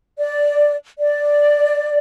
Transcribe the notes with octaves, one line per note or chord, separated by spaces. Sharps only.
D5
D5